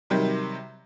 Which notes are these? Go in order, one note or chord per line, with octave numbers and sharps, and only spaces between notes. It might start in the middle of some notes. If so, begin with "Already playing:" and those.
C3 D#3 F#3 G3 G4